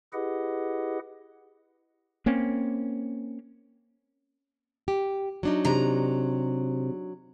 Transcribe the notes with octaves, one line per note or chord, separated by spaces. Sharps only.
E4 G4 G#4 B4 D#5 F#5
A#3 C4 C#4
G4
F#3 D4 D#4
C3 A#5